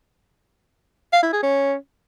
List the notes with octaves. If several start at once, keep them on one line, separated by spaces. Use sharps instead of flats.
F5
E4
G#4
C#4